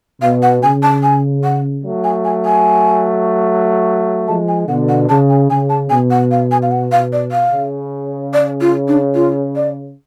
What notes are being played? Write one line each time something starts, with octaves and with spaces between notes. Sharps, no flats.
B2 F5
F#5
C#3 G#5
A5
G#5
F#5
F#3 A3
G#5
G#5
G#5
F3 G#3 A5
G#5
B2 D3 F#5
F#5
C#3 A5
G#5
C#3 G#5
A5
B2 G#5
F#5
F5
G#5
F5
F#5
F5
D5
F5
C#3
D5
F4
D4
F4
D5